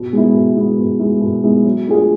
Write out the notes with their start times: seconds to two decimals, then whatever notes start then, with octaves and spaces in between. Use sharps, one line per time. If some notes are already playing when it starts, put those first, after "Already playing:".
Already playing: B2
0.13 G#3 B3 E4
0.35 B2
0.56 G#3 B3 E4
0.79 B2
0.99 G#3 B3 E4
1.21 B2
1.43 G#3 B3 E4
1.65 F#3
1.87 A3 D4 F4 G#4